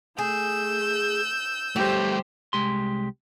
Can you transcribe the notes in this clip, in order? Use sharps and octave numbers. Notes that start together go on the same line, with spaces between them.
A3 G#4 E6 G6
F#3 G3 A3 G4 C5
C2 G#3 G4 C6